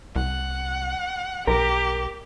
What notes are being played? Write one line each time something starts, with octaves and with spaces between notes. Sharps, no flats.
C2 F#5
B1 G4 A#4